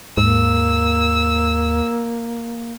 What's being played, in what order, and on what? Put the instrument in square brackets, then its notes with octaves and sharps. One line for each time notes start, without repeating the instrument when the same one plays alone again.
[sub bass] D#2 [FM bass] G#2 [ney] A#3 [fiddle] E6